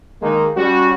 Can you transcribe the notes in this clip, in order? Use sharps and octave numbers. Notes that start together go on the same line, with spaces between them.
D#3 G#3 A#3 D#4
G3 C#4 F#4